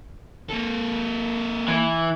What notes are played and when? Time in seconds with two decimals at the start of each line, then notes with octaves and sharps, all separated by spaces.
0.49 A#3 A4
1.68 E3